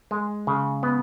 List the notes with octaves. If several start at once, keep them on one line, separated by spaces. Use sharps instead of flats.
G#3
C#3
B3